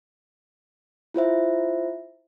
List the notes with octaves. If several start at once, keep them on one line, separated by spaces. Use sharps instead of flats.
E4 F4 C5 E5